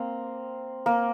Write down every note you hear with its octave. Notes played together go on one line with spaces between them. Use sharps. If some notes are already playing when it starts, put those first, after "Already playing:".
Already playing: A#3 C4
A#3